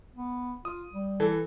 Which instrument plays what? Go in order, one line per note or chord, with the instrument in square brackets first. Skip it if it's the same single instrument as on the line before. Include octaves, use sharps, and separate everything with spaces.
[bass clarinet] B3
[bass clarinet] F4 [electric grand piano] D#6
[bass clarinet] G3
[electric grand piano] E3 [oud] A4